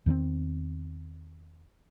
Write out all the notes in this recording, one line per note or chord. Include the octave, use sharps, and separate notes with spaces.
E2 D#3 A#3 C4